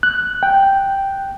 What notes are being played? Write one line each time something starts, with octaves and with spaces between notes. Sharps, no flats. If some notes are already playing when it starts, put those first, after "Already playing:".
F#6
G5